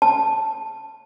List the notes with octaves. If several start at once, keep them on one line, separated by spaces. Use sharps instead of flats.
A5